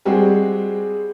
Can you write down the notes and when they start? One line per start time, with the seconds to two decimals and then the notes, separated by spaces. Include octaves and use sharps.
0.05 G3 G#3 C4 F#4 G#4